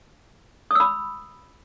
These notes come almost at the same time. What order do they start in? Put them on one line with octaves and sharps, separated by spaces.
D#6 E6 B5